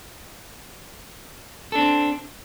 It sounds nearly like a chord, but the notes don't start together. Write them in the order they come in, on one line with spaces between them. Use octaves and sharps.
A4 D4 C4